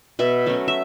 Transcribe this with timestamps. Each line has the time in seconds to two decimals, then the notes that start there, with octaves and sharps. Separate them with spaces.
0.19 B2 B4 E5
0.46 F#3 A3 C#4
0.68 E5